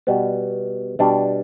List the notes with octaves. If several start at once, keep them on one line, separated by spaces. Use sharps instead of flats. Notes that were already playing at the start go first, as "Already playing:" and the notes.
B2 G3 B3
B2 G3 D4